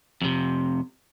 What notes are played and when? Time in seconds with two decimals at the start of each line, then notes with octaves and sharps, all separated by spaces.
0.22 F2 C3